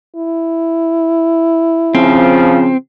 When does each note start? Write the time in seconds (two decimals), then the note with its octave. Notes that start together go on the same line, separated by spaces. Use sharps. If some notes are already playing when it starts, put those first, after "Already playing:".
0.15 E4
1.95 C#3 F3 C4